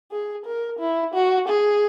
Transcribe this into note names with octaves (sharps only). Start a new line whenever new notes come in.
G#4
A#4
E4
F#4
G#4